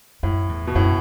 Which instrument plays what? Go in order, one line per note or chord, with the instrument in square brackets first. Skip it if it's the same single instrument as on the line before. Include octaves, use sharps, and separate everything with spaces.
[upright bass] F#2 [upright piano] A2
[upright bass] E2
[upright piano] B2
[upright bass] F#2 [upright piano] A2